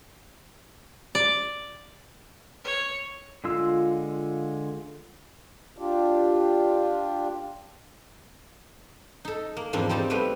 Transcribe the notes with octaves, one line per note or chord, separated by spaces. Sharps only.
D5
C#5
D3 G#3 F4 E6
D4 F4 G4
D#4 A4
A#3
E2 G#2 F3 A#3 C4 D4
G3 C4 D#4 A5 A#5
G3 A3 B3 B4 F5 G5